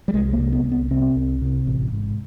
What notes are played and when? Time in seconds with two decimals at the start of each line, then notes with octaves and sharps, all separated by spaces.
0.08 G3
0.14 C2 G#3
0.33 A#3
0.39 C3
0.52 B3
0.65 C2
0.72 B3
0.91 C3 C4
1.16 C2
1.41 C3
1.67 A1
1.92 G#2